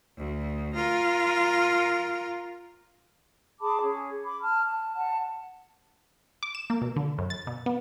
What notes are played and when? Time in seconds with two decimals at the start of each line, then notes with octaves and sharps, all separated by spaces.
0.17 D2
0.74 F4 A#4
3.60 G#4 A5 B5 D6
3.80 C#4 G#4
4.23 B5 D6
4.41 A5 F6
4.65 A5
4.94 F#5 A5
6.43 D6
6.55 E7
6.70 A#3
6.82 B2
6.96 D3
7.19 F#2
7.30 A6
7.47 B2
7.66 B3